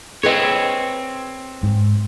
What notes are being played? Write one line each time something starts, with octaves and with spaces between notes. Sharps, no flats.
C4 G#4 B4 C#5 D#5
G#2